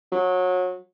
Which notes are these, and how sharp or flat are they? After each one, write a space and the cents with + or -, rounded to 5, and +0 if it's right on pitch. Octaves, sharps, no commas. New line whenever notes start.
F#3 -25